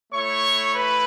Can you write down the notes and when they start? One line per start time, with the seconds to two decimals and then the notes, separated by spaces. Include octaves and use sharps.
0.12 A3 E4 C#5 C#6
0.74 B4 B5